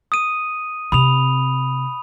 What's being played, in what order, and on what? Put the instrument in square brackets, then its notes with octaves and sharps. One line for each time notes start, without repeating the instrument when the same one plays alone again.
[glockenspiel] D#6 D#7
[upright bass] C3 C4 [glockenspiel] B5 D#6 F7